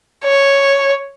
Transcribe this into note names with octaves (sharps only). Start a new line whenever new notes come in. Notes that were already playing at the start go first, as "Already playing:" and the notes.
C#5